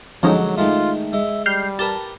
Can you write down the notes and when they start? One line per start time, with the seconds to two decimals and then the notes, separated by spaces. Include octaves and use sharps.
0.23 D3 F3 F#3 G#3 C#4 D#4
0.58 D#3 G#3 A3 F4
1.13 G#3 E5
1.46 G3 F6 G6 C7
1.79 G4 A#4 B4 A5